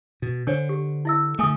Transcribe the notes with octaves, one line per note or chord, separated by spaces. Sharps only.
B2
D3 D4 C5 C#5
G4
E4 E5 E6
D3 A3 A4 G#5 D#6